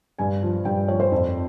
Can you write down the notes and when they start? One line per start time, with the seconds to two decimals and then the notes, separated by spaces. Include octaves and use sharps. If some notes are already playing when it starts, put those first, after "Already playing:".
0.19 G2 G#5
0.43 F3
0.65 G2 G5
0.88 F3 C#5
1.00 C5
1.12 F2